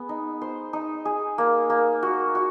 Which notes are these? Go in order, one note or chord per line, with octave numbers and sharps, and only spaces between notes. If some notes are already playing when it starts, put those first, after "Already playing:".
Already playing: B3 G#4
D#4
C5
D#4
G#4
A#3
A#3
F#4
F#4